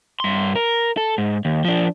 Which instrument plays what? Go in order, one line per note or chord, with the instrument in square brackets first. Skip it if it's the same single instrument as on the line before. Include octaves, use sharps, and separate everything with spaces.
[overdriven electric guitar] G2 C6
A#4
A4
G#2
D#2
F3 D4